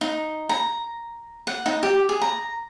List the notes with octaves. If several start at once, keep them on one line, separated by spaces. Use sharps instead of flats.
D#4
A#5
F#5
D#4
G4
G#4
A#5